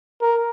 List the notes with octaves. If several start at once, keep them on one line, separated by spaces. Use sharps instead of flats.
A#4